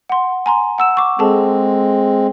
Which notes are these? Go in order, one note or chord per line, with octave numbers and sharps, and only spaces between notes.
F#5 C6
G#5 A#5 C6
F#5 E6 E7
C#6 D6
G#3 C4 G#4 A4 A5